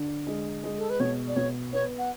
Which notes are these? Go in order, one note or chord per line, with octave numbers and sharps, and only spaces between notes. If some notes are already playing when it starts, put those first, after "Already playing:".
Already playing: D3
G#3
G#3
A4
B4
B2 C#5
D5
B2 C#5
B3 C#5
F#5